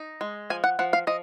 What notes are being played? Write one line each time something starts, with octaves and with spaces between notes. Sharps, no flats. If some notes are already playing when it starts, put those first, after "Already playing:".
Already playing: D#4
G#3
F3 G#5
F#5
F3 F#5
F5
F3 D#5